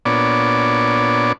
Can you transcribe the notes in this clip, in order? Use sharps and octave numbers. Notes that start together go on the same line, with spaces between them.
A#2 B3 D4 C#5 D5